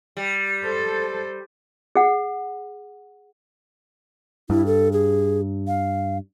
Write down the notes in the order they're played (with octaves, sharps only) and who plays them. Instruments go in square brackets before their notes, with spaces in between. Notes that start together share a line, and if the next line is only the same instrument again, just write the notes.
[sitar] G3
[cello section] A4 C5
[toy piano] G#4 F#5
[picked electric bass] G2 [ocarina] E4
[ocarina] A4
G#4
F5